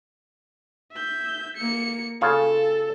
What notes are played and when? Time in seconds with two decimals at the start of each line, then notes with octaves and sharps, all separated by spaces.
0.92 E5 G6
1.57 A#3 C#7
2.21 C#3 F4 A4 C#5